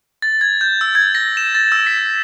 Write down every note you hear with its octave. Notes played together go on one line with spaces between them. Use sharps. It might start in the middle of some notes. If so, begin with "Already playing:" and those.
A6
G#6
G6
E6
G#6
A#6
E7
A6
E6
B6